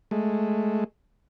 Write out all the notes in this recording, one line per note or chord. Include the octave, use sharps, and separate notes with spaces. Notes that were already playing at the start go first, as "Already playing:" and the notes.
G#3 A3